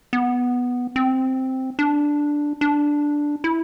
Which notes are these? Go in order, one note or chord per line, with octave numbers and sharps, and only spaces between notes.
B3
C4
D4
D4
E4